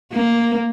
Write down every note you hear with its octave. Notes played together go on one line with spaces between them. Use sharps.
A#3